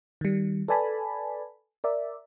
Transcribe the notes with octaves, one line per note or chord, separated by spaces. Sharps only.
D#3 G3
A4 B4 D5 G#5 A5 B5
A#4 D5 E5